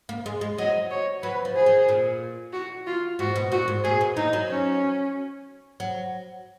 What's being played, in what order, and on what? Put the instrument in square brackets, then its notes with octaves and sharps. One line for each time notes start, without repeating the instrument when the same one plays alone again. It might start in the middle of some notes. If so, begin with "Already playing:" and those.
[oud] A#3
G#3
G#3
[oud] F#3 [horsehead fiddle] D#5
[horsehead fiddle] C#5
[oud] F#3 [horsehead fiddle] B4
[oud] F3
[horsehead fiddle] G#4
[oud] D#3
A#2
[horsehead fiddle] F#4
F4
[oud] G#2 [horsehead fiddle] F#4
[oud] B2
[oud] A#2 [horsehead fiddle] F#4
[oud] G#2
[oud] A#2 [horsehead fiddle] G#4
[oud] B2
[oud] A#2 [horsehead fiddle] D#4
[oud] F#3
[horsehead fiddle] C#4
[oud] F#3